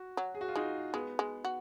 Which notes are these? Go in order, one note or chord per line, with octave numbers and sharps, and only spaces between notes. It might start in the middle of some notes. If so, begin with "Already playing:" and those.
Already playing: F#4
F#3
G#4
F#4
F4
G#3 D#4
G#3 B3
G#3
F#4